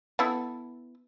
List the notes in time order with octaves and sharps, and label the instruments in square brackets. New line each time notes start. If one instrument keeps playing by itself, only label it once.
[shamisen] B3 E4 A4